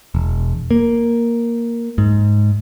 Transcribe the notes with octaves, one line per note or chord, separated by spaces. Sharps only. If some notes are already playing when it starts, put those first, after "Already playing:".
E1
A#3
G#2